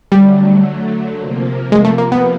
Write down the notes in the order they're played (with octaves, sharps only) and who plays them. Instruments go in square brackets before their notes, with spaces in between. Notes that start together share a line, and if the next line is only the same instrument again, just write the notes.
[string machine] D3 F#3 A3 [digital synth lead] G3
[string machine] C3 F3 A#3
[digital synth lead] G#3
A3
A#3
B3